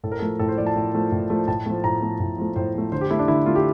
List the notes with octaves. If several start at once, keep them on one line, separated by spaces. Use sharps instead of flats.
A2 A4
A#4
F3 A3 A4
A2 A4
C5
F3 A3 D5
A5
A2
F3 A3
A2
F3 A3
A2 A5
F3 A3
A2 A#5
F3 A3
A2
F3 A3
A2 C5
F3 A3
D3 C5
G4
A3 E4
D4
D3 E4
A3 F4
G4